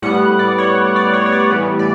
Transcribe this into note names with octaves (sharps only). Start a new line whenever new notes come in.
A2 G3 B3 F#5
D5
C#5
D5
C#5
C#5
D5
A2 E3 G3 B3
D5